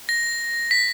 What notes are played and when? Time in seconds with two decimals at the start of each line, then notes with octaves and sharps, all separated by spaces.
0.09 A#6
0.71 B6